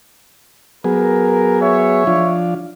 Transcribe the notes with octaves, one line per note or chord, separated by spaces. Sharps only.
F#3 B3 G#4 A#4
C#5 E5
F3 D4 F4